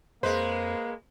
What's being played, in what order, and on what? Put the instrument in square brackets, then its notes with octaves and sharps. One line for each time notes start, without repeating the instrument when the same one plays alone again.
[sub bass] F2 [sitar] G#3 B4 [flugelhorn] A#3 [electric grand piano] C5